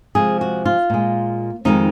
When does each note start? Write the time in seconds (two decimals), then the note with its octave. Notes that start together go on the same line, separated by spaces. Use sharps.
0.15 C3 F3 G#3 G#4
0.41 F#4
0.65 F4
0.90 A#2 G#3
1.65 F2 D#3 G#3 D#4